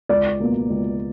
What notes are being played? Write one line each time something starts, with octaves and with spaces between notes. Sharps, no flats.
C#2 D5
B2 A#3
C#2